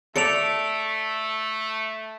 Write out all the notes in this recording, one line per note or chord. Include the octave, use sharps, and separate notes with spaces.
A3 A4 D5 C#7 D7 F7